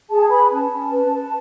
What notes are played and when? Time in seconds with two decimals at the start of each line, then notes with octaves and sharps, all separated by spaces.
0.10 G#4 A5
0.29 B4 B5
0.51 C#4 A5
0.71 C#4
0.91 B4
1.12 B4